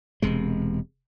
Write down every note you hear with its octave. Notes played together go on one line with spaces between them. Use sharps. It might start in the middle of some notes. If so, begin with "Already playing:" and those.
E1 C3 G#3